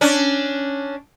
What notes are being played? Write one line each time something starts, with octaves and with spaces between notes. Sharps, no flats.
C#4 D4